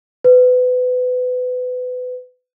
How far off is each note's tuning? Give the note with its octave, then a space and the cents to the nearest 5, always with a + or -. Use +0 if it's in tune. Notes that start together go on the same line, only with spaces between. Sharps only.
B4 +25